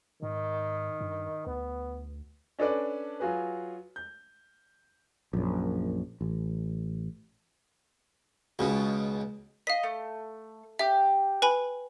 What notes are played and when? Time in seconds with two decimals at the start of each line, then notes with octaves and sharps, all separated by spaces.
0.22 G#2 D#3
1.01 G2
1.47 D2 B3
2.59 C#4 D4 A4 B4 D5
3.20 F#3 F4 F#4 G#4 B4
3.96 G6
5.33 A#1 F#2
6.21 A1
8.59 C#2 B2
9.67 D#5 F5 B6
9.83 A3
10.79 G4 E5
11.42 B4 G#5 B5